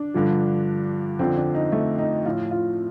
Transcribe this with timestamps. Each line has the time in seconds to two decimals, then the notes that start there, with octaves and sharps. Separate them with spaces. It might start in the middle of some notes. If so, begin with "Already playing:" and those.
Already playing: D4
0.14 G2 D3 F3
1.19 F2 D3 F3 C4
1.37 D4
1.55 D#4
1.72 A3
1.99 D#4
2.25 A2 F3 F4
2.51 F4